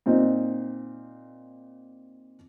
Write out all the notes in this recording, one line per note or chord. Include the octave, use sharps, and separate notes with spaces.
A#2 C4 D#4